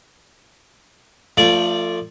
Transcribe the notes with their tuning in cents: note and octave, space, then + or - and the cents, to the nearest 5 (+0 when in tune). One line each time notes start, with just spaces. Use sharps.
F3 +0 A3 +30 D5 -10